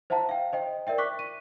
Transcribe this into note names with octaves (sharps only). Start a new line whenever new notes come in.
C5 E5 F#5 A5 A#5
F5 G5
C5 D#5 G5
A#4 D5 E5 G5
C#6 D6 F#6 B6
D#7